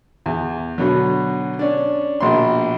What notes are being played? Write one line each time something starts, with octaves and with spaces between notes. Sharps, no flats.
E2
B2 D3 F#3
C#4 D4
A#1 B2 C6